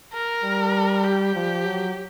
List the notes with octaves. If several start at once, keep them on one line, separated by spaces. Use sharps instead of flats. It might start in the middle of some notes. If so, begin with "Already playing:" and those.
A#4
G3
G4
F3
F#3